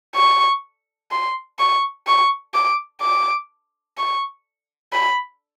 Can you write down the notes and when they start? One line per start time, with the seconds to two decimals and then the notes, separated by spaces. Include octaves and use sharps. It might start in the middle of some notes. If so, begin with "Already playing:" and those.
0.15 C#6
1.11 C6
1.59 C#6
2.07 C#6
2.54 D6
3.01 D6
3.97 C#6
4.92 B5